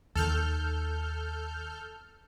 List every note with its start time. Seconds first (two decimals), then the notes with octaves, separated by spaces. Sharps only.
0.15 D#2 D#3 A4 F6 G6